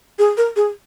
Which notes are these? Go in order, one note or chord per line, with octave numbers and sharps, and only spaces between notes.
G#4
A#4
G#4